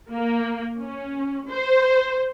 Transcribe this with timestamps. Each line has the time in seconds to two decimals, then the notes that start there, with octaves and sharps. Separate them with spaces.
0.12 A#3
0.81 C#4
1.49 C5